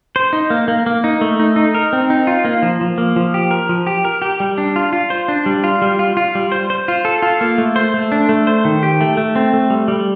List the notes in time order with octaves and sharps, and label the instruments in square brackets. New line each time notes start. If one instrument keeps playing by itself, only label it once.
[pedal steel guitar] C5
D#4
A#3
A#3
A#3
D#4
A3
D#4
D#4
A#4
C4
D#4
F4
A#3
F3
F3
A#3
F3
G4
A#4
F3
G4
A#4
G4
G3
D4
F4
F4
C5
D4
G3
F4
G3
F4
F4
G3
C5
C5
F4
A4
F4
A#3
A3
C5
A3
D4
A3
C5
D#3
G4
A3
A3
C4
A3
G3
G3